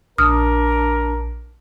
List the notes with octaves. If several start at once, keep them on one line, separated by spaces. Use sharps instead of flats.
A#1 D4 A#4 D#6 F6